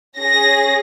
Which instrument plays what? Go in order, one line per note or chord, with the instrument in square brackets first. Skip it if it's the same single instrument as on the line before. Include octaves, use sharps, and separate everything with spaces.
[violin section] C#4 G#4 A#6